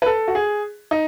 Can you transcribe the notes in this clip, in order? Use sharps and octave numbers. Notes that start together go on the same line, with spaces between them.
B4
A4
F#4
G#4
D#4